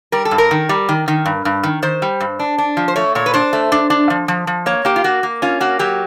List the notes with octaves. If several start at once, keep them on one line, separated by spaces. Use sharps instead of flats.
G3 A#4
A4
G2
A#4
D#3
G3
D#3
D#3
G2
G2
D#3
D#3 C5
G3
G2
D4
D4
F3
C5
A3 C#5
A#2 C#5
B4
D4 C5
A3
D4
D4
F3
F3
F3
A#3 C#5
A#3 G4
F4
A#3 F#4
A#3
C#4 F4
A#3 F#4
F#3 G4